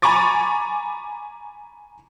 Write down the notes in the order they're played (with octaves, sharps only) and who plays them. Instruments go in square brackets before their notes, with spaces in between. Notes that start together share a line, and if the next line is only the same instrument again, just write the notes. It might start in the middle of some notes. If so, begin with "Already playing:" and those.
[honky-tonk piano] G#5 A#5 B5 C#6 D6 A6